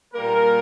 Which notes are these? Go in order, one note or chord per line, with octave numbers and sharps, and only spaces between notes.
A#2 G3 A#3 A#4